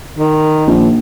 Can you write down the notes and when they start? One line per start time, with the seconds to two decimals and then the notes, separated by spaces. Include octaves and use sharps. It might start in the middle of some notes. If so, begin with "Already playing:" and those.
0.19 D#3
0.67 A#1